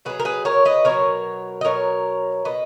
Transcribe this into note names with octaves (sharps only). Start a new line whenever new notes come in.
B2 F#3 G#4 B4
A#4
G#4 B4
A#4 C#5
B4 D#5
B2 F#3 A#4 C#5
D#5
B2 F#3 A#4 C#5
B2 F#3 B4 D#5